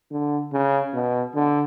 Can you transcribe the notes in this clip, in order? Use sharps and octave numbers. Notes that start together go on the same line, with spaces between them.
D3
C#3
B2
D3